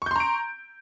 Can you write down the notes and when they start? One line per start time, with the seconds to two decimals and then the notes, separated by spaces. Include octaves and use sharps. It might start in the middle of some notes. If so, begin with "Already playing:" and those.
0.02 C#6
0.06 G6
0.11 C6
0.16 A#5
0.20 D7